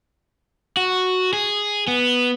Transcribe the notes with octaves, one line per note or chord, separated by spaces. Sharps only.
F#4
G#4
B3